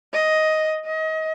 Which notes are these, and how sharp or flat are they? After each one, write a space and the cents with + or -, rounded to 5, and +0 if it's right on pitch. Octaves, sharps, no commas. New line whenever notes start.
D#5 +10
D#5 +30